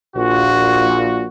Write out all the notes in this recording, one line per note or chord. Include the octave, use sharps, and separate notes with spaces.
A#1 A#2 F#4